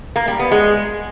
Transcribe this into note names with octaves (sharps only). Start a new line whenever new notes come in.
A#3
G3
B3
G#3